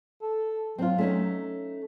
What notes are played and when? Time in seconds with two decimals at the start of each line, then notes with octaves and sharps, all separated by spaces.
0.22 A4
0.78 F#3 C4 F4
0.98 A3 C#4 D#4